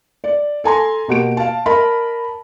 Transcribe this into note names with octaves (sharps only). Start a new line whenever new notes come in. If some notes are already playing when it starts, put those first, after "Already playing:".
D5
A4 G#5 A#5 C6
B2 A#3 F#4 G4 D7
F5 A5
A#4 D#5 A5 B5